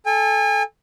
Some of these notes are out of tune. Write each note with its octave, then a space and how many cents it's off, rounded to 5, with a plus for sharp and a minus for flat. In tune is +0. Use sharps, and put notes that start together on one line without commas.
A4 -15 G#5 -35